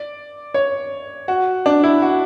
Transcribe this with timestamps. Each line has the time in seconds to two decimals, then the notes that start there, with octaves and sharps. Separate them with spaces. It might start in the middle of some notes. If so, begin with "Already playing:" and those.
Already playing: D5
0.54 C#5
1.28 F#4
1.66 D4
1.83 E4
2.02 F#4